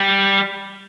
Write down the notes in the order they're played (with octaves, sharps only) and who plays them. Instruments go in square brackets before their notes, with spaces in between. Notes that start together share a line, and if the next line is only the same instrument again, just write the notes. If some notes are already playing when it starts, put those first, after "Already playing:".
Already playing: [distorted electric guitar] G3